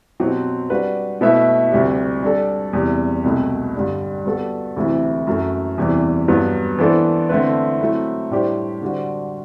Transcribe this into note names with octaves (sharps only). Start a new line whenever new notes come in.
B2 F#3 C4 G4 C5
G3 D4 F#4 B4
B2 A3 E4 B4 E5
D2 C3 G3
G3 D4 A4
E2 C3 G3
C2 B2 A3
G2 D3 G3 D4
G3 B3 F#4 A4
D2 C3 E3 A3 E4
F#2 F#3 A3
E2 C3 E3 G3
G2 F#3 B3
E3 B3 D4 A4 C5
D3 A3 C4 E4 B4
F#3 A3 C4 E4
A2 G3 D4 G4 C5
D3 G3 D4 F#4 C5